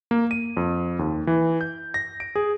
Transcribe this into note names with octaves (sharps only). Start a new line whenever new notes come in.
A#3
D#7
F2
D#2
E3
G6
A#6
D7
G#4